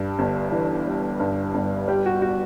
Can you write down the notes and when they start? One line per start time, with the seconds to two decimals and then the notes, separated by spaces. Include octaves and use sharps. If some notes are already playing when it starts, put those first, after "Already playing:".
Already playing: G2 G3
0.19 G1
0.52 E3
0.87 G3
1.20 G2
1.54 G1
1.88 G3 G4
2.06 F#4
2.22 F#4